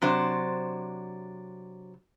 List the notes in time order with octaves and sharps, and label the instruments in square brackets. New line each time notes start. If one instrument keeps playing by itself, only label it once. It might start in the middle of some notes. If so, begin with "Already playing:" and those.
[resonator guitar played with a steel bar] C3 F#3 D4 C5